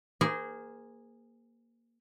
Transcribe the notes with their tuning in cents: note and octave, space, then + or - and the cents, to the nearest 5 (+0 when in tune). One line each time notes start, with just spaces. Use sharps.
A#3 +0 G#4 -10 C5 -30